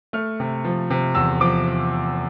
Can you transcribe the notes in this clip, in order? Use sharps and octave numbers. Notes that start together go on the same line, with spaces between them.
A3 F6
C3
F3
C3
E2 E6
F3 D6